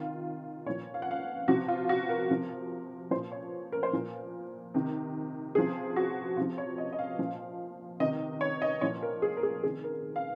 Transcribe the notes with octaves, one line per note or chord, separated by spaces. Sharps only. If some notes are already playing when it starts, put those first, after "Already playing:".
Already playing: C3 D#3 F4
A#2 F3 C#5
F5
F#5
F5
C3 F3 F#4
F4
F#4
A#4
C3 F3
A#2 F3 C5
C#5
A#4
C5
A#2 F3 A#4
C3 D#3
C3 F3 G#4
F#4
C3 F3 F4
C#5
D#5
D#5
F5
A#2 F3
C3 D#3 D#5
C#5
D#5
A#2 F3 C#5
A#4
G#4
A#4
G#4
C3 D#3 G#4
A#4
F5